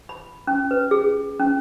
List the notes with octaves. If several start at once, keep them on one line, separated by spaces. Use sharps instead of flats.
B5
C#4
B4
G#4
C#4